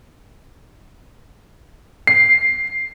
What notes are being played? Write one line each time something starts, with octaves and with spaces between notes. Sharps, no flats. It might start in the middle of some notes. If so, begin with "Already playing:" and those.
C7